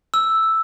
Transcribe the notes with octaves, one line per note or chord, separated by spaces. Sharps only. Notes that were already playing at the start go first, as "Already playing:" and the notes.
E6